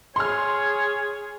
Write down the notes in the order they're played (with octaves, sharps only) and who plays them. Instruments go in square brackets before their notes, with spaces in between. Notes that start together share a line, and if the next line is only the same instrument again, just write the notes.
[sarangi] G#4 [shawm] C#5 [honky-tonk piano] C6 F6